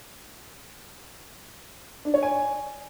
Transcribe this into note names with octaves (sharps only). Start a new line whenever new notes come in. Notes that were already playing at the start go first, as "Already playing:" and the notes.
D4
C#5
G#5